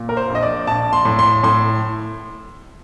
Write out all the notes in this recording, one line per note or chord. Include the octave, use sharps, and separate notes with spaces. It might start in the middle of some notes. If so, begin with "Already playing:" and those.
Already playing: A#2
A#4
C5
A#1
D#5
D5
A#1 A5
C6
A2
C6
A2 C6